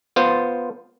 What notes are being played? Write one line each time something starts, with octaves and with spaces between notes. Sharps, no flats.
B3 F4 C5